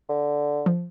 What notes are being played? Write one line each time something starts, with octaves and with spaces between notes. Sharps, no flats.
D3
F3